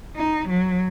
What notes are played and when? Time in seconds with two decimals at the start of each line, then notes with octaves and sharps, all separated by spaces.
0.16 D#4
0.49 F#3